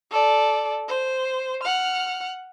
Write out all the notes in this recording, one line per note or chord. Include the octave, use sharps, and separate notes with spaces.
A4 D5
C5
F#5 F6